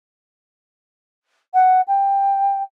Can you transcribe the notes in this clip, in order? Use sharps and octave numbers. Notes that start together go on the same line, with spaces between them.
F#5
G5